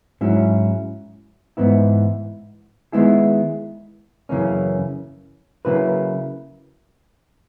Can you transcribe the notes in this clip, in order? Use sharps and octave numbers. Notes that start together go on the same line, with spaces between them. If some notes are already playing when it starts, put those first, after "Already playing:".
G#2 F#3 C#4 E4
G#2 E3 B3 E4
D#3 G#3 B3 E4 G#4
F#2 C#3 E3 A#3 C#4
C#3 F#3 A#3 E4 B4